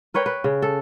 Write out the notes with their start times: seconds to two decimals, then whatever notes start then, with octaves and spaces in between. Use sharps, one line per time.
0.14 A#4 B4 C#5 G5
0.26 B4
0.44 C#3
0.62 A4